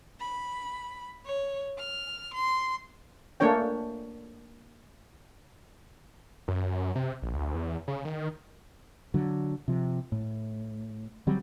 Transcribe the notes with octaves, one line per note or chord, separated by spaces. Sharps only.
B5
C#5
F6
C6
A3 A#3 D4 C#5 G5
F#2
F#2
C3
A#1
D2
E2
C#3
D#3
D3 F#3
C3 F3
A2
D3 F#3 G3 C4